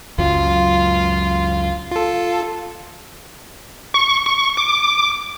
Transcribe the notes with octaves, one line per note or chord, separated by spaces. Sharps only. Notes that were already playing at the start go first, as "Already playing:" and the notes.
C#2 F#2 F#3 F4
F4 A4
C#6
C#6
D6